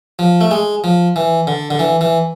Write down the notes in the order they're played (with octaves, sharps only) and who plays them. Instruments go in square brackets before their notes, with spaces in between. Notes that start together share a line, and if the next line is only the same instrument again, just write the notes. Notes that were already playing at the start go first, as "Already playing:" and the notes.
[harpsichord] F3
A3
G#3
F3
E3
D3
D3
E3
E3